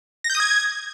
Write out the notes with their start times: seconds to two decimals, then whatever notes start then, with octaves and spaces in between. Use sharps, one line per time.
0.24 A#6
0.30 G6
0.35 D#6
0.40 G#6